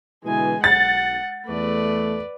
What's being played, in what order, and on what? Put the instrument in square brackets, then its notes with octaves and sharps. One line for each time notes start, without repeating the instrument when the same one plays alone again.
[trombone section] B2 D3 E3 [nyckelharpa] G#3 G#5
[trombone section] B1 [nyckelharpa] F#5 [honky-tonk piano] A6
[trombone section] E2 A3 [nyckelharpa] B4 D5